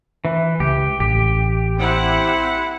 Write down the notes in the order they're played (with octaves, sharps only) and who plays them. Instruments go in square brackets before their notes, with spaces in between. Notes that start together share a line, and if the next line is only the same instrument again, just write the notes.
[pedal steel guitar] E3
[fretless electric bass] C#2 [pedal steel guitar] G4
[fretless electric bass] A1 [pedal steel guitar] G4
[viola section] C4 E4 F#5